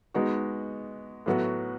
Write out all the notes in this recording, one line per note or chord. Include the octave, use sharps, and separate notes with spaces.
G#3 B3 D#4 F#4
A2 F#3 B3 F#4